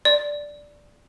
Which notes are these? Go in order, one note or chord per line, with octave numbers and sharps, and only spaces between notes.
D5